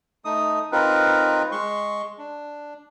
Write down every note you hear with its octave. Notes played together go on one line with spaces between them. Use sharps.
A3 D#4 D#6
C4 D#4 F4 A#4 B4
G#3 C6 C#6
D4